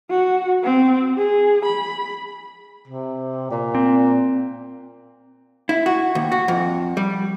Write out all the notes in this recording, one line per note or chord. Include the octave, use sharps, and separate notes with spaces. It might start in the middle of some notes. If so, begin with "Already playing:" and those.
F#4
C4
G#4
B5
C3
A#2
C4
E4
F#4
D#2
F#4
F2
G3